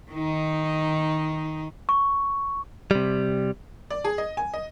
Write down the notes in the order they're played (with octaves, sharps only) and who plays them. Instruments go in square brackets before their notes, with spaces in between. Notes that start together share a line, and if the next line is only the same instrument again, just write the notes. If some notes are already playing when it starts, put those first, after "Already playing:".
[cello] D#3 D#4
[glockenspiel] C#6
[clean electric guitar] C3 G3
[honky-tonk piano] D5
G#4
D#5
G#5
D#5